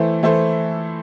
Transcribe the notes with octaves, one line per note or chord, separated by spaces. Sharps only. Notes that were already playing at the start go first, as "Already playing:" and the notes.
Already playing: E3 A3 E4 A4 C5
E3 A3 E4 A4 C5